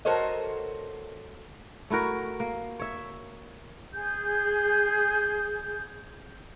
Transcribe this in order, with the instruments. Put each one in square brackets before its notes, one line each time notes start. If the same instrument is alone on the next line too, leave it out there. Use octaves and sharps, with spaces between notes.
[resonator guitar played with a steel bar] F#4 A4 A#4 C5 C#5 D#5
[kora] A3 E4 F#4 A#4
A#3
C#5 E5
[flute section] G#4 G6